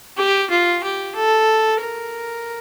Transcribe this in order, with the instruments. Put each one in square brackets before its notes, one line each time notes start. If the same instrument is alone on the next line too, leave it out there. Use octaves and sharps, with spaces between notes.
[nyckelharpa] G4
F4
G4
A4
A#4